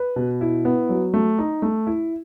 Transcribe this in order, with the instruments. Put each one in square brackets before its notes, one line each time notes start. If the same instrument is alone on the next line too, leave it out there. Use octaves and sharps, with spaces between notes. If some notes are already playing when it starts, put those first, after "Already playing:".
Already playing: [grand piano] B4
B2
E4
B3
F#3
A3
D#4
A3
E4